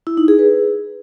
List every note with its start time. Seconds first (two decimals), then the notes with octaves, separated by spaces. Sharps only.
0.07 E4
0.17 D#4
0.28 G#4
0.39 B4